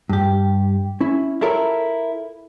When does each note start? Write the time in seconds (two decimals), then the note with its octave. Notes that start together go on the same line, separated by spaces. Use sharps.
0.09 G2 G4
1.01 C#4 E4
1.41 E4 F4 A4 A#4 C#5 E5